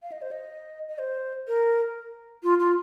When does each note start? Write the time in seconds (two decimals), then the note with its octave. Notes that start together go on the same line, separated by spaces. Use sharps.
0.03 F5
0.12 D#5
0.22 C5
0.31 D#5
0.89 D#5
0.99 C5
1.48 A#4
2.43 F4
2.60 F4